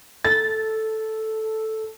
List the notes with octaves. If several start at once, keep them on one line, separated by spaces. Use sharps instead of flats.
A4 A6